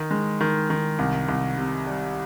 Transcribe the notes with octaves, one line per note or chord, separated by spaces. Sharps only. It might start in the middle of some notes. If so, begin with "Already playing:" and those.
Already playing: D#3
G#3
D#3
D#3
C2
C2
C3
G3